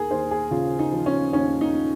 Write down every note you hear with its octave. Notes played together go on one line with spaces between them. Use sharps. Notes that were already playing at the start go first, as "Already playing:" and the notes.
Already playing: D#2 G#4 A#4
D#2 C5
G#4
C#3 F4
D#4
F3
C#4
D#2 C#4
D#4